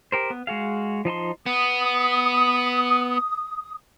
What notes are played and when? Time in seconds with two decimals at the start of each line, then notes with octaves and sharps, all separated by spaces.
0.12 G4 A#4 C5
0.30 B3
0.47 G#3 F#4 G#4 F5
1.05 F3 D#4 A5 C6
1.46 B3 D#6